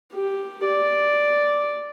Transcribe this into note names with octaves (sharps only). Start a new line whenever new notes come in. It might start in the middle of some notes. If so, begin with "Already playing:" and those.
G4
D5